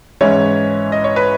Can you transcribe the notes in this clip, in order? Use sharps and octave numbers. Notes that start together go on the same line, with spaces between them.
G#2 E3 G#3 C#4 E4 C#5
D#5
C#5
B4